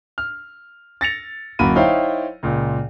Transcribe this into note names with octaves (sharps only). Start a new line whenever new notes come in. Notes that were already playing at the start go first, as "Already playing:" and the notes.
F6
A6 A#6 C#7 F7
D1 F#2 A#3 F#4 B5 D#7
D#4 E4 C5 C#5 F5 G5
C#2 A#2